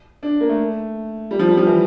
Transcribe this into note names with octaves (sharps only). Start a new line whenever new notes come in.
D4
A#3
A3
G3
F3
G3
F3
E3